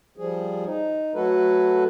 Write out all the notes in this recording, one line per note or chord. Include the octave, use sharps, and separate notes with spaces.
F3 G3 G#4
D#4
F#3 A3 F#4 A4 B4